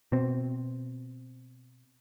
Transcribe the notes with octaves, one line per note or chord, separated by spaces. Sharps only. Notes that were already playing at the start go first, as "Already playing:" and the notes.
B2 C4